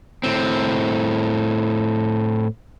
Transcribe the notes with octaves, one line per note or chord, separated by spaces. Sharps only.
A2 C4